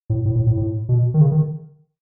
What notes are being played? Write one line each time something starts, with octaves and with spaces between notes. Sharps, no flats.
A2
A2
A2
A2
A2
B2
D#3
C#3
D#3